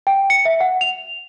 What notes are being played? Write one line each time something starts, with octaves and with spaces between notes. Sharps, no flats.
G5
C#7
E5
F#5
F7